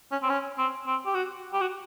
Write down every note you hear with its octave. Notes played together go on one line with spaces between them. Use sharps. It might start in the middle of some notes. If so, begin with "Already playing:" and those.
C#4
C4
C#4
C4
C4
G4
F#4
G4
F#4